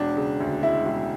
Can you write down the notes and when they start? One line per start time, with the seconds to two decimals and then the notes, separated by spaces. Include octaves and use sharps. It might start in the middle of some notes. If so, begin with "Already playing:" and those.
Already playing: E1 D4
0.17 C#3
0.40 D2
0.62 G#3 E4
0.86 E1